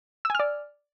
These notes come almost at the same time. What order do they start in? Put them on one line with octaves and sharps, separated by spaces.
E6 G#5 F6 D5